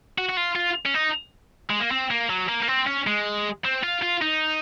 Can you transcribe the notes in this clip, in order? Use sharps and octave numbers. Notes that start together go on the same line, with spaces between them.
F#4
F#4
F4
F4
C#4
D#4
G#3
A#3
C4
A#3
F#3
A#3
A#3
C4
C#4
G#3
C4
F4
F4
D#4